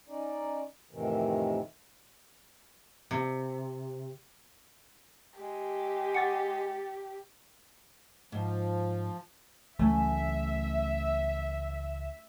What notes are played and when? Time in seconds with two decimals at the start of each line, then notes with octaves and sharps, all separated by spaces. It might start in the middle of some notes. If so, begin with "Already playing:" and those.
0.08 C#4 D#4 D5
0.91 F2 A2 C3 D#3 E3
3.11 C3
5.40 G#3 G4
6.14 F#5 C#6 D6 A6 C#7
8.32 G#2 F3
9.79 C#2 E3 F#3 A3 C#4 E5